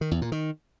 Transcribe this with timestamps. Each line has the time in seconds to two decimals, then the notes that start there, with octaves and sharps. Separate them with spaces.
0.01 D#3
0.11 E2
0.22 A#2
0.32 D#3